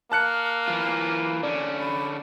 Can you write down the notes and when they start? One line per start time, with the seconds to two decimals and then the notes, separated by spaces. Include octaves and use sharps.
0.12 A#3 A5 F6 F#6 C#7
0.68 E3 F4
1.43 D3 C#4 D5
1.80 B5